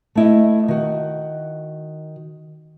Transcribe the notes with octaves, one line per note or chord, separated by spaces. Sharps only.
A3 E4 D#5
D#3 F#4